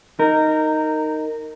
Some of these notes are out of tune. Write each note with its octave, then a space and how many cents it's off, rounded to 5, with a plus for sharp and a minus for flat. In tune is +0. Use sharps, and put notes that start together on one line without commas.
D#4 +0 A#4 -15